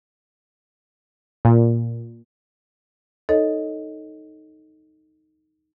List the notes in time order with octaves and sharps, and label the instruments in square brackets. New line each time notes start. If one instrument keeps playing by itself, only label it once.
[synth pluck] A#2
[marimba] D#4 A4 C#5 D#5